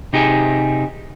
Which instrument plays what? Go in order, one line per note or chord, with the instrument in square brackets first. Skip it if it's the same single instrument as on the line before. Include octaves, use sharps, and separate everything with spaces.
[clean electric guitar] C3 D#4 G4 G#4